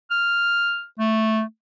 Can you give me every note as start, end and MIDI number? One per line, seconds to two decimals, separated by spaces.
0.11 0.84 89
0.99 1.42 57